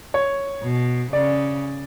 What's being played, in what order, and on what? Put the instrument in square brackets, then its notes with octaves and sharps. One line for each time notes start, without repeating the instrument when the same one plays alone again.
[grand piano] C#5
[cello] B2
[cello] C#3 [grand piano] D5